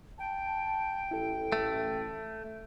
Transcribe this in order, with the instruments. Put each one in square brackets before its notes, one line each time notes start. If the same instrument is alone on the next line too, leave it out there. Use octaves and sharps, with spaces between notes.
[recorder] G5 [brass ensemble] A5
[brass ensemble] A1 [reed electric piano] E4 A4
[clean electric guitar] A3